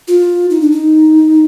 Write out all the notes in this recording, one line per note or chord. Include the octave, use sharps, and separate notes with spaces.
F4
D#4
D4
D#4